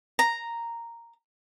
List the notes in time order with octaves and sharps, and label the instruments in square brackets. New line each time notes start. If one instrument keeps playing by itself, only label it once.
[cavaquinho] A#5